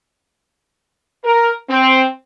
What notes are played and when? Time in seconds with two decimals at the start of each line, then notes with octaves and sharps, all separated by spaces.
1.25 A#4
1.69 C4